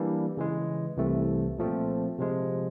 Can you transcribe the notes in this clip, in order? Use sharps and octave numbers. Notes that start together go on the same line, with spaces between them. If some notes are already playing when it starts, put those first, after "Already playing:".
Already playing: E3 G3 A#3 D4
C#3 E3 G#3
C2 C3 E3 A3
A#2 F3 A3 C4
C3 F3 G#3